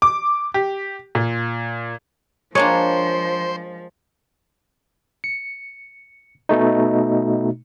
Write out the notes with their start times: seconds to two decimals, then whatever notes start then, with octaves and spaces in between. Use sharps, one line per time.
0.02 D6
0.54 G4
1.15 A#2
2.55 F3 G#3 A#3 D4 C5 C#5
5.24 C#7
6.49 B2 A3 D#4